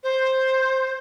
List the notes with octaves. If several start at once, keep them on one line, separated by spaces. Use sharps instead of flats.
C5